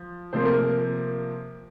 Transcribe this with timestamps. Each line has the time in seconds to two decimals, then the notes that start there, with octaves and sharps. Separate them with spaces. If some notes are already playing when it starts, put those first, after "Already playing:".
Already playing: F3
0.33 C3 F3 A#3 C5
0.45 A#4